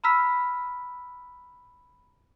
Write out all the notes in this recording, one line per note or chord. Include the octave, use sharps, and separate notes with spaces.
A#5 B5 E6 F6 B6